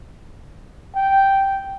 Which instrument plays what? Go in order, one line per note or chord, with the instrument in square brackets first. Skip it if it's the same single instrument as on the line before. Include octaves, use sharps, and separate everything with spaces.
[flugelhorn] G5